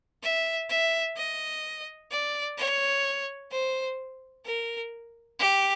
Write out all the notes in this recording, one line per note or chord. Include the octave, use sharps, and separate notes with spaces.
E5
E5
D#5
D5
C#5
C5
A#4
G4